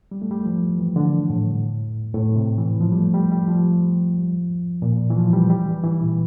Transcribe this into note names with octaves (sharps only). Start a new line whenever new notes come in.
G3
A3
G3
F3
E3
D3
A2
A2
C3
E3
F3
G3
A3
G3
G3
F3
A#2
E3
F3
G3
G3
E3
E3
A#2